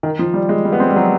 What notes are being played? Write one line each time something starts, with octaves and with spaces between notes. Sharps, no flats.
D#3
F3
G3
G#3
G3
B3
C4
G3
F#3